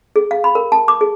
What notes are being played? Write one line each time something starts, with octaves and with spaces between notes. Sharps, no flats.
G#4
F5
B5
A#4
A5
D6
G#4